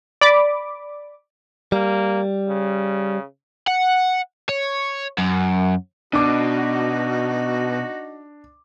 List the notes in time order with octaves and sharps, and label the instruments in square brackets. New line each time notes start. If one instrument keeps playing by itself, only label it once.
[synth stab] D5 B5 D6
[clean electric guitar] G3 [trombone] A#3
[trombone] C#3
[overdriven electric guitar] F#5
C#5
F#2
[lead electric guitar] B2 [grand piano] D4 D6 [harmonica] D#4 F#4